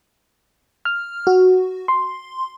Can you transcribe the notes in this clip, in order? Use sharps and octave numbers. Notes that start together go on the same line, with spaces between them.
F6
F#4
C6